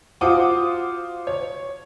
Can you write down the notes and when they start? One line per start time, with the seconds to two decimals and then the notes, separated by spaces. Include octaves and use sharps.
0.21 F4 F#4 C5 F#5 D6 D#6
1.27 C#5